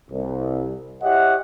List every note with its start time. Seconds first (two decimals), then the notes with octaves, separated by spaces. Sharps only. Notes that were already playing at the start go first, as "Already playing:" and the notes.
0.11 C2
1.03 E4 G4 C#5 D#5 E5 F#5